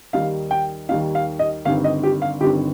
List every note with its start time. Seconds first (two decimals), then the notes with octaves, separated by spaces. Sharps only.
0.13 D#2 D#3 G3 D#4 F5
0.51 G5
0.89 D#2 D#3 G3 D#4 F5
1.15 F5
1.39 D#5
1.65 G1 G2 D#3 C4 F5
1.84 D#5
2.03 G4
2.22 F5
2.40 G1 G2 D#3 C4 G4